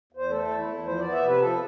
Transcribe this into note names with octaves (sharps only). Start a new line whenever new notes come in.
E2 C5
A3 A4
E2
E4
E2
F3 C5
B3 D5
E5
C3 B4
F3 A4